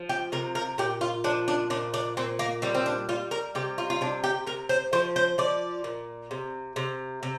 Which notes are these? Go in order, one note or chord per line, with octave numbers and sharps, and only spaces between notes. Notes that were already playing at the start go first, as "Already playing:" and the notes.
Already playing: F3
G4
C3 A#4
A#4
A#2 G4
F4
F3 D4
D4
A#2 D4
D4
A#2 C4
A#3
G3 C4
C4
D4
G3 F4
A#4
C3 G4
F4
F4
C3 D4
G4
C3 A#4
C5
F3 C5
C5
F3 D5
A#2
C3
C3
C3